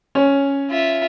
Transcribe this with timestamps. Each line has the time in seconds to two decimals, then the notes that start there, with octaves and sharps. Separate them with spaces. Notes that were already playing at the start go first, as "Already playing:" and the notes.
0.15 C#4 C#5
0.71 F4 E5